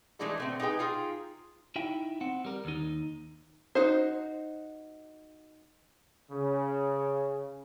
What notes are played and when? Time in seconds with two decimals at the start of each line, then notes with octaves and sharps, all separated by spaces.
0.19 E3 G#3 A3 D4 E4 A4
0.38 B2 A3 C4
0.60 D#4 G4 G#4 B4 G5
0.79 D#4 F4 G#4 G5
1.76 D#4 E4 E5 G5
2.21 C4 F#5
2.45 G3 A#4
2.65 D#2 D#4
3.75 D#4 F#4 C5
6.31 C#3